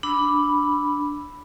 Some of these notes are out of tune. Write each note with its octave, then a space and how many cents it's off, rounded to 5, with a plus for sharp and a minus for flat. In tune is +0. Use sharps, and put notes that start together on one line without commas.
D4 +0 B5 +0 E6 +0